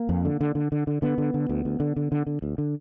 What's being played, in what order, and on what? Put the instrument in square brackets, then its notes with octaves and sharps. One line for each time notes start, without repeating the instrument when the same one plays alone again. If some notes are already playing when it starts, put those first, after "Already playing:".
Already playing: [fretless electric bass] A#3
F2
D3
D3
D3
D3
D3
D3 B3
D3
D3
D2
D2
D3
D3
D3
D3
D2
D3